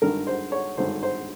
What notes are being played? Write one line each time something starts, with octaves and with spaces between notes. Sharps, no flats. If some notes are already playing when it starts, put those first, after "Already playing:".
G#1 G2 D3 A#4
C5
C#5
G#1 G2 D3 C5
C5